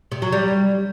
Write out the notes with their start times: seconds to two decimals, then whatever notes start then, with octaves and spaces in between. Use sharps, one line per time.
0.12 C3
0.22 F#3
0.32 G3